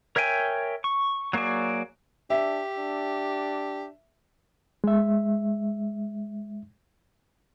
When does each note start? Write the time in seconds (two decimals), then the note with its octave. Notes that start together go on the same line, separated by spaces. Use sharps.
0.16 A#4 C#5 E5 G5 G#5
0.84 C#6
1.33 F#3 A#3 F#4 G#4 D5
2.30 D4 G4 E5
2.79 D4
4.84 G#3 E5